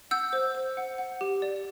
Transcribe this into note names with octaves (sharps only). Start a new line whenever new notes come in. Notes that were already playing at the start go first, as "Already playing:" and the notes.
F#5 E6 G6
C5
C5
F#5
F#5
G4
D5